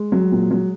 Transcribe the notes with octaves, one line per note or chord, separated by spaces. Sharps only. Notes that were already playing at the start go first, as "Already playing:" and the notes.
Already playing: G#3
F#3
A#2
F#3